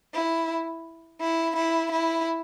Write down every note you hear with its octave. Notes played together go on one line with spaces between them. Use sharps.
E4
E4
E4
E4